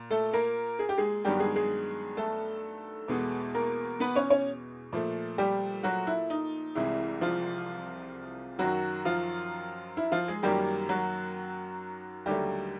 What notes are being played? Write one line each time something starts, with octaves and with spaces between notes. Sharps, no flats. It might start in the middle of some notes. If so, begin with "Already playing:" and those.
Already playing: A#2
A3 A4
A#3 A#4
G#4
G4
G#3 G#4
G2 D#3 F#3 G3 B3 G4
G#3 G#4
G#3 G#4
A3 A4
E2 B2 G#3 B3
A#3 A#4
B3 B4
C#4 C#5
C#4 C#5
A#2 F3 A3
G3 G4
F#3 F#4
E4
D#4
C2 C3 E3 G#3 E4
F3 F4
F#2 D#3 F#3 F#4
F3 F4
E4
F3 F4
G#3 G#4
F#2 D#3 F#3 G3 A#3 G4
F#3 F#4
D#2 D3 F#3 G3 A3 G4